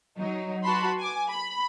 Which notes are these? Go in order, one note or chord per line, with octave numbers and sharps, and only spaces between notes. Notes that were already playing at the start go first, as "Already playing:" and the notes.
F#3 D#4
F#4 B4 A5 B5 C6
G#5 D6
B5